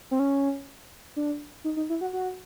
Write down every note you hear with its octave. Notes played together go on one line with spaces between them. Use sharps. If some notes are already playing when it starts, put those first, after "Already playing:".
C4
C#4
D4
D#4
D#4
E4
F#4
F#4